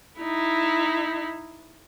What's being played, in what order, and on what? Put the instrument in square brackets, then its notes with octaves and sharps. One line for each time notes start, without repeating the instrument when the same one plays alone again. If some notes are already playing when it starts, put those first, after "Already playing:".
[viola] D#4 E4